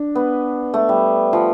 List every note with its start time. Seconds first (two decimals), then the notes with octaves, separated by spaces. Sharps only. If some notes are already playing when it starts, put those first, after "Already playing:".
Already playing: D4
0.15 B3
0.74 A3
0.89 G3
1.33 F3